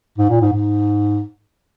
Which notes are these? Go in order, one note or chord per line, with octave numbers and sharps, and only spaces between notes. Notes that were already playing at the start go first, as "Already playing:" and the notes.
G#2
A#2
G#2
G#2